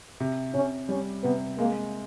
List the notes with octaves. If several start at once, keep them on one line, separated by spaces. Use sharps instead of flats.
C3
C3 C#4
G3 C#4
C3 B3
G#3 A#3